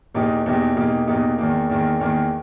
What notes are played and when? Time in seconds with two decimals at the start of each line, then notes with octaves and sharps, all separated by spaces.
0.15 E2 B2 A#3 D#4 G4
0.46 E2 B2 A#3 D#4 G4
0.77 E2 B2 A#3 D#4 G4
1.07 E2 B2 A#3 D#4 G4
1.38 E2 D#3 A#3
1.70 E2 D#3 A#3
2.00 E2 D#3 A#3